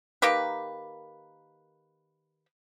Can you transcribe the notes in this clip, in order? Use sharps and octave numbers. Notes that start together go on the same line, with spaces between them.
D#3 A#3 G4 B4